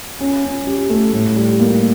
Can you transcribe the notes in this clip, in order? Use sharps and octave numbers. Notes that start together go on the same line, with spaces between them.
C#4
C#4
G4
A3
A2
G3
A#3